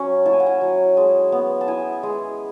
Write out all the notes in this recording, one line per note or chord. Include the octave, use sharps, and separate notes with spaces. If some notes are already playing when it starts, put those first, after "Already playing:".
Already playing: F#3 C#4
E4 A5
G#5
F#5
G#5
F#3
G#3 A5
B3
A5
E4 G#5
G#3